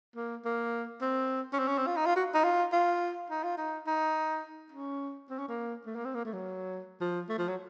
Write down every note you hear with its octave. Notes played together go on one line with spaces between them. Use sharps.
A#3
A#3
C4
C#4
C4
C#4
C4
F4
D#4
F4
F#4
D#4
F4
F4
D#4
F4
D#4
D#4
C#4
C4
C#4
A#3
A3
A#3
C4
A#3
A3
F#3
F3
A3
F3
F#3